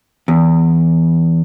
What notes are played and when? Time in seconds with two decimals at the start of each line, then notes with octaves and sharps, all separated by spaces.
0.28 E2